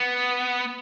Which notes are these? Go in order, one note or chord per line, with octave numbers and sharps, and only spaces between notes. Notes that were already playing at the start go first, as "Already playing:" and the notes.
Already playing: B3